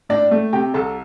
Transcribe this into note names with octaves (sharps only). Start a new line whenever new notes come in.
A2 D4 D5
A3
C3 G4 G5
C2 A4 A5